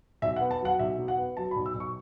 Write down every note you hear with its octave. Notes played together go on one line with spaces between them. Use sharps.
B1 E5
F#5
B3
A5
F#3 F#5
B1 E5
B2
F#5
B3
F#3 A5
B5
B1
E6
B1
C#6